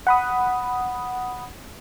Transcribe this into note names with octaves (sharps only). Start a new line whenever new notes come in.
F#5 B5 D#6